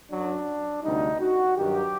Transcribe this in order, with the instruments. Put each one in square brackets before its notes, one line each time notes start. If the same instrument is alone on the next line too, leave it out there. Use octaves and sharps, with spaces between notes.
[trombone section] F#2 F#3 D4
D2 C3 G3 D#4
F#4
G2 D#3 F#3 G4